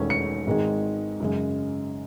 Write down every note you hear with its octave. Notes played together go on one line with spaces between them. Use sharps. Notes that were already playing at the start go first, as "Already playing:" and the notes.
Already playing: E1 E2 D#3 A3 C#4
C#7
G#1 G#2 D#3 G#3
F#2 C#3 G#3